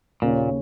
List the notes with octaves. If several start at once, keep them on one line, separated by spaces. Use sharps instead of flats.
D#2 A#2 C#3 A#3 C#4